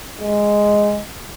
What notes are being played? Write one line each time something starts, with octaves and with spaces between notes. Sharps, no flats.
G#3